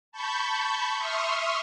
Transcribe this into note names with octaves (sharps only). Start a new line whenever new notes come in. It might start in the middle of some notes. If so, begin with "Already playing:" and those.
A5 B5 C#6 G6
E5 C6 C#6 D#6 F6